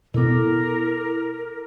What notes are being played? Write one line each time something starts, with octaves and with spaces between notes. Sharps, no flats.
B2 B3 E4 A4 A#4 D6